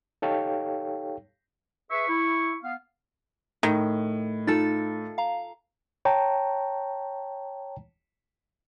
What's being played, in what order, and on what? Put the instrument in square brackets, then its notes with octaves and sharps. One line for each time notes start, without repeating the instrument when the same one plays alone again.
[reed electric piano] D#4 G4 A4 C#5 F5 G5
[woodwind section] G#4 B4 E5 [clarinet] C#6
[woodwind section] E4
B3 F5
[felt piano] A2 [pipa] D#3
[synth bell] D#4 A6 [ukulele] F4 A4
[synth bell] F5 A#5
[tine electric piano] C#5 G5 A5 A#5